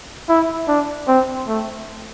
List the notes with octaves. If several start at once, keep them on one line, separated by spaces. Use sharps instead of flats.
E4
D4
C4
A3